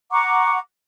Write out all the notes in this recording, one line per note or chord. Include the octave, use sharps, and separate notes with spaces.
F#5 A#5 C#6 D6